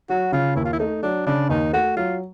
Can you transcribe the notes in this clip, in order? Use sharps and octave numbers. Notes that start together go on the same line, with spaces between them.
F#3 F#4
C#3 F4
D#2 E4
F4
E4
A3 D#4
F#3 D4
C#3 D4
D#2 D#4
A3 F#4
F#3 F4